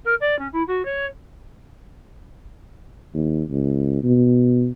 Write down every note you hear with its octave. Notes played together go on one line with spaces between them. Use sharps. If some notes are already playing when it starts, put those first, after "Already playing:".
A#4
D5
C#4
E4
F#4
C#5
D#2
C#2
B2